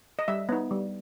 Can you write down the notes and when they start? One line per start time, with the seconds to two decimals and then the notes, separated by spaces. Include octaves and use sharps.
0.19 D#5
0.28 G3 E5
0.49 B3 D#4
0.71 G3